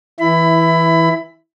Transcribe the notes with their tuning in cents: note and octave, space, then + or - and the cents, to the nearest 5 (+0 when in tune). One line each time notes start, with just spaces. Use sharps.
E3 -10 E4 +0 B5 +20